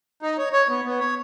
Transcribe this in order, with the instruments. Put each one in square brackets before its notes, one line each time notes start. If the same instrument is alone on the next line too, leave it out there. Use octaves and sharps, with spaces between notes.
[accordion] D#4
C#5
C#5
B3
B3
C#5